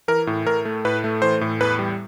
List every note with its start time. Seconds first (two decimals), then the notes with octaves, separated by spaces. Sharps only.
0.08 E3 A#4
0.27 A2
0.47 A2 A#4
0.65 A3
0.85 A2 B4
1.04 A3
1.22 E3 C5
1.41 A2
1.61 E2 B4
1.79 G3